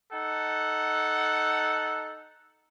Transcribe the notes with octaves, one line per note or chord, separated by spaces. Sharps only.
D#4 A4 F#5